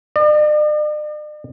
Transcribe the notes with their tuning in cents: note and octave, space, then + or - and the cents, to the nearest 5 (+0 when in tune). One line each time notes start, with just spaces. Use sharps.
D5 +45